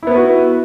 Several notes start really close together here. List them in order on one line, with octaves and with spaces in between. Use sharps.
E4 B3 B4 F#4